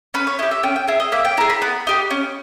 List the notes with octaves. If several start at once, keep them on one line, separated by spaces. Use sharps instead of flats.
C#4 B4
C#5
E4 G4 D#5
E5
C#4 G5
G5
E4 G#4 E5
D#5
A#3 E5
G5
E4 G#4 A#5
B5
B3 B5
D#4 G4
C#4